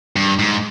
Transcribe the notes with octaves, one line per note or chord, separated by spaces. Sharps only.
G2
G#2